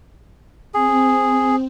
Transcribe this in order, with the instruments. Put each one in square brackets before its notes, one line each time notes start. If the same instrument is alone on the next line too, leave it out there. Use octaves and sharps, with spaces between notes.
[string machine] C4 [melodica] G#4